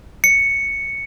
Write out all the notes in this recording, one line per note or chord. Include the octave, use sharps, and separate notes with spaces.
C#7